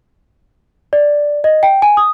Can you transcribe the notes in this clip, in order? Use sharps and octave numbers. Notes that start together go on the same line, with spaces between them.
D5
D#5
G5
G#5
D#6